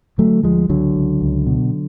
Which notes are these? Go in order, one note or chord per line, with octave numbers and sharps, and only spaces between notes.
D3 F#3 A3
D2 F3 G#3
C#2 D3 F#3
C#2
C#2
B2